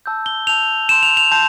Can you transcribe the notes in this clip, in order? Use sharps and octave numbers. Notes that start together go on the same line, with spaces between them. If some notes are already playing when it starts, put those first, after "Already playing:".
A5 E6 G6
G7
A5 E6 G6 F7
A5 C6 G6 E7
F7
F7
A5 C6 G6